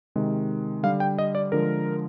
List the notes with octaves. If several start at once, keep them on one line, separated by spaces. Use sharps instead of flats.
C3 D#3 G#3
D3 G3 F5
G5
D#5
D5
D3 F3 G#3 A#4